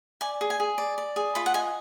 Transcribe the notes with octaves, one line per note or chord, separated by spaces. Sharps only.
D5 G#5
G#4
G#5
G#4
D5
D5
G#4
F4 B5
F#5
D#5 G#5